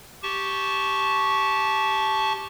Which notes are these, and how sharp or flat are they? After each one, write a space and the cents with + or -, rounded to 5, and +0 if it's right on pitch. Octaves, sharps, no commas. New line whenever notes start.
G4 -5 A5 -15 C#6 +0